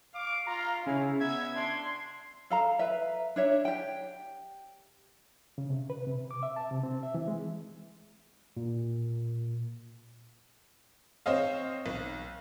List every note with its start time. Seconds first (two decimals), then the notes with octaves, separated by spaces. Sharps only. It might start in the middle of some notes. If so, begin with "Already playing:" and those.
0.14 F5 D6
0.46 F4 A#5
0.86 C#3 E4 G#5
1.20 B3 E5 G#6
1.55 D4 C6
2.50 A4 F5 A#5
2.79 B4 E5
3.36 D4 C#5 E5
3.65 G4 G5
5.58 C#3
5.70 C3
5.90 B4
6.06 C3
6.31 D6
6.43 E5
6.56 A5
6.71 C3
6.83 C4
7.03 E5
7.15 E3
7.28 G#3
8.57 A#2
11.26 C4 C5 C#5 D#5 F5
11.86 B1